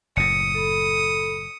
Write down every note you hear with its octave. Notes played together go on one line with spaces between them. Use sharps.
F#1 A2 D#6 C#7
A4 B5